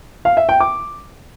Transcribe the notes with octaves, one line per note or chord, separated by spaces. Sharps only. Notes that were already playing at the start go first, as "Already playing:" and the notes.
F5
E5
G5
D6